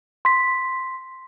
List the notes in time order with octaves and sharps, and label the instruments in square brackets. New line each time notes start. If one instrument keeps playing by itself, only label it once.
[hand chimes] C6 B6